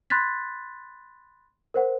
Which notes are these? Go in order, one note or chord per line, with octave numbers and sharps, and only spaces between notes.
B5 C6 F#6 G#6 A6 B6
A#4 C5 F#5